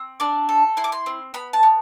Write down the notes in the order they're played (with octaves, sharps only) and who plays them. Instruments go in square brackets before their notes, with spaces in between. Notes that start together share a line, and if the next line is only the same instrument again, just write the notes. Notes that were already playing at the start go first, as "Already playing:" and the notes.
Already playing: [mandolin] C4
D4 D6
A4
E4 C6
D6
C6
C4
B3 B5
A5
B3